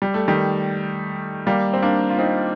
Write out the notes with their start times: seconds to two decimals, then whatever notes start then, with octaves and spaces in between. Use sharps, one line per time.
0.02 G3
0.14 A3
0.28 D#3 G3
1.47 G3 A#3
1.73 C4
1.82 A#3 D4
2.10 F4
2.19 C4 D#4